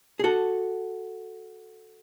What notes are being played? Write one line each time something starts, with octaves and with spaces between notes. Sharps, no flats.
G#4
F#4 A4